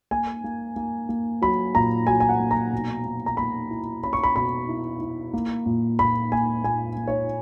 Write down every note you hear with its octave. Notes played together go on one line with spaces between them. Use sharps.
A#3 G#5
A#3
A#3
A#3
F#3 B5
A#2 A#5
F#3 G#5
G#5
F#5
A#3
A#5
B2
A#3
A#5
A#3 B5
E4
C#4 B5
C#6
B5
B2 B5
E4
E4
A#3
A#2
A#2 B5
A#3 G#5
A#2 G#5
A#3
C#5